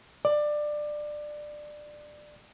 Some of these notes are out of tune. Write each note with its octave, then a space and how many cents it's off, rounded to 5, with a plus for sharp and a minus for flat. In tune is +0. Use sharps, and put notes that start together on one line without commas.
D5 +20